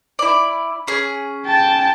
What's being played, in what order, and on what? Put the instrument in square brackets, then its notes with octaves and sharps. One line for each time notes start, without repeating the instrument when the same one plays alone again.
[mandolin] E4 D5
C#4 G#4
[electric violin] G5 A5